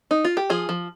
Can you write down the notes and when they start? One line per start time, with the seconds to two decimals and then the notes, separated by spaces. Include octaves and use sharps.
0.11 D#4
0.25 F4
0.37 G4
0.50 F3 F4 G#4
0.69 F3